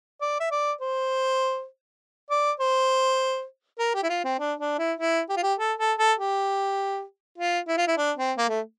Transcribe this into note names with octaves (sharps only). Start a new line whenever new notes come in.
D5
E5
D5
C5
D5
C5
A#4
G4
E4
F4
C4
D4
D4
E4
E4
G4
F4
G4
A4
A4
A4
G4
F4
E4
F4
E4
D4
C4
A#3
A3